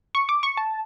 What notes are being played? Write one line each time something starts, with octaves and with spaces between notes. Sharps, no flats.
C#6
D6
C#6
A5